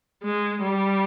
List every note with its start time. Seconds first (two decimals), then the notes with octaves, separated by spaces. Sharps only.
0.24 G#3
0.62 G3